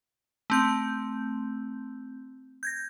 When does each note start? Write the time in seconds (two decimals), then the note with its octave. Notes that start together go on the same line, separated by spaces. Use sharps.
0.50 A3 C4 G6
2.63 G6 G#6 A#6